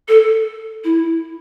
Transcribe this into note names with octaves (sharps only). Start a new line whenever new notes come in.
A4
E4